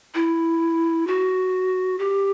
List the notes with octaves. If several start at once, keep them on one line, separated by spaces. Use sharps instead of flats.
E4
F#4
G4